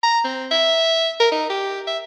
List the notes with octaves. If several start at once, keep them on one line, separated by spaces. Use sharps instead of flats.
A#5
C4
E5
A#4
D#4
G4
E5